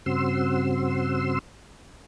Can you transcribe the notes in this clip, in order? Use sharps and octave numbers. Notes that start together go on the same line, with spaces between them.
G2 C#3 C4 F#4 C6 E6